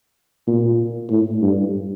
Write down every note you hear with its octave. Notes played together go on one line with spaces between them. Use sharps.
A#2
A2
G2